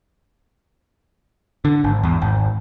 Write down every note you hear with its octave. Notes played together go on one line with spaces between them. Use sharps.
D3
G#1
E2
G#1